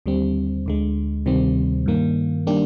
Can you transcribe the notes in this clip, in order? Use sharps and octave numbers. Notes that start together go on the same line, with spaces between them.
D#2 D3 G3 C4
D2 D3 G#3
D2 C3 D#3 G3 C4
G2 D#3 A#3
D#3 G3 A#3 D4 G4